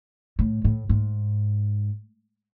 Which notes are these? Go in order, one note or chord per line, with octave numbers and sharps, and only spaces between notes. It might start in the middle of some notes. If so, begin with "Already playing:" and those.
A2
A2
G#2